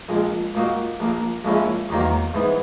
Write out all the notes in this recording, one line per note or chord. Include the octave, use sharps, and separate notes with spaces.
A#1 A#2 G#3
A#2 A#3 D#4 F#4
A#1 A#2 A#3
A#1 A#2 G#3 C#4 E4
E2 D#3 F#3 A#3
G#2 E3 B3